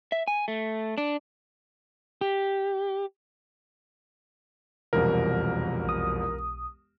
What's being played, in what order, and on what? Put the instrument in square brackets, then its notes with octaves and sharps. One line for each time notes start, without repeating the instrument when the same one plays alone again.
[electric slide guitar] E5
G#5
A3
D4
G4
[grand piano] E1 C2 F2 [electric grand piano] A#4
[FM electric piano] B1 D#6